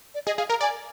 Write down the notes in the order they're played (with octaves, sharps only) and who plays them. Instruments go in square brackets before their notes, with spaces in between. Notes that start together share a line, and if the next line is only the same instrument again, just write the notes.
[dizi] D5
[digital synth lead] G#4 [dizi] D#5
[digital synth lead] G#4 [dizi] F5
[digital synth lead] A#4 [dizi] A#5
[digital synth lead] D5 [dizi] G#5